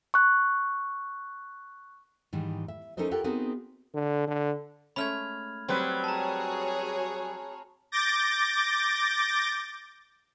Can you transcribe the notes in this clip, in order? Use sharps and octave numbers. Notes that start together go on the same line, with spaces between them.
C#6 F#6
G#2 D#3 E3 G3
E5
C#4 D#4 A4 A#4 C5 D#5
F4 G4 A4 A#4 F#5 G5
B3 C4 D#4 F#4 G#4 A#4
D3
D3
G#3 A3 C#4 B5 F6 G#6
F#3 G3 C4 B4
F#4 G#4 C#5 A5 A#5
D6 G6 A6 A#6